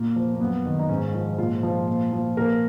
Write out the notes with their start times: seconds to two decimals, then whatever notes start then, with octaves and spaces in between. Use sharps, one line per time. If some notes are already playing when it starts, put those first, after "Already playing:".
Already playing: A#2 A#3
0.16 F3
0.35 A#3
0.40 F#2 B3
0.65 D#3
0.79 D#4
0.89 G#2 C#4
1.14 F3
1.38 A#2 F4
1.63 F3
1.88 A#2
2.12 F3
2.37 A#2 A#4